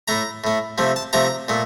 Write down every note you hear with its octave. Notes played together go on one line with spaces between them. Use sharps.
A2 A3 A#5
A2 A3
C3 F3 A3
A5
C3 F3 A3 A#5
A#2 A3